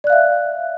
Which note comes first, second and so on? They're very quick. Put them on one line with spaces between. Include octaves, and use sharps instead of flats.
D5 F#6 F5 E5